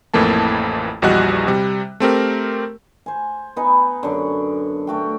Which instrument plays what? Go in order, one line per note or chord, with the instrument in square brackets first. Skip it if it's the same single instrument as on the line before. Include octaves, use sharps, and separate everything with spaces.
[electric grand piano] A1 F2 E3 A3 A#3 A5
A#1 E2 G3 F#4 D#5 F#6
C3 G3
A3 C4 G4 A#4
[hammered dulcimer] C5 G#5
B3 D#4 B4 G#5
F#2 D3
A3 F#4 G5